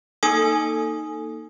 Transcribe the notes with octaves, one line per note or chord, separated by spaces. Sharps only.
A#3 D#4 A4 G#5 D#6